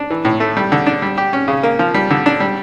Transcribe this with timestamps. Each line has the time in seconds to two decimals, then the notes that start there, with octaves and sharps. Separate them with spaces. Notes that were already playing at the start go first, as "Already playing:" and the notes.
Already playing: D4
0.10 E3
0.25 A2
0.40 A3
0.57 G3
0.72 D3
0.87 D4
1.02 G3
1.18 G4
1.33 C#4
1.48 C#3
1.63 A#3
1.79 F3
1.94 G3
2.10 D3
2.26 D4
2.40 G3